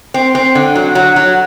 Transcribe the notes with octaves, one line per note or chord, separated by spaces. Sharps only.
C4
C4
D3
F#3
F#3
F#3